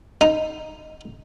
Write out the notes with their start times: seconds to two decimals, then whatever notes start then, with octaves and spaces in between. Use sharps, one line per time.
0.21 D#4